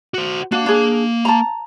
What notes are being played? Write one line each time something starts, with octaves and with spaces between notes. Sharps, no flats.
F#4 C5
A#3 D4 F#4 F5
D4 G#4
A5 A#5